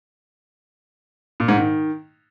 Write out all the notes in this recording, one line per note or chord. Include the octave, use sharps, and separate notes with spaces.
A#2
G#2
D#3